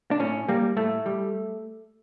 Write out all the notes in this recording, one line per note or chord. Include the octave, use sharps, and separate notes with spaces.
D4
A2 C#4
G3 A#3
A2 A3
G3